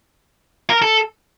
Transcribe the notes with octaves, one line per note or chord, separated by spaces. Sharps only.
A#4
A4